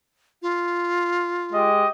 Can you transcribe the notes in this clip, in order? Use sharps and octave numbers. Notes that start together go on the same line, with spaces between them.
F4
G#3 G4 D#5